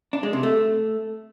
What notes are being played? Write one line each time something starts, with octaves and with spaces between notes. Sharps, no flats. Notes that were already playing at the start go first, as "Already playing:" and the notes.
D4
G#3
C3
A3